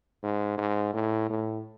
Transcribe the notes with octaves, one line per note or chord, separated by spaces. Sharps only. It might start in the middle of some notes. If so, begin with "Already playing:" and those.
G#2
G#2
A2
A2